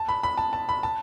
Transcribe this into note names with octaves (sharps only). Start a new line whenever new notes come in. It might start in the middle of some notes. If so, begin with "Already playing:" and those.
Already playing: A5
B5
B5
A5
A5
B5
A5